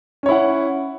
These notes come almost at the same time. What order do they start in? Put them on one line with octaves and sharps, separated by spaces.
C#4 C#5 E4 F#5